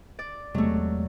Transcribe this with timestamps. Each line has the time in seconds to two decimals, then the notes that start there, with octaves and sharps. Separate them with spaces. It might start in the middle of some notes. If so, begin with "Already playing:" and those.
0.19 D5
0.54 E2 C3 F#3 G#3 A3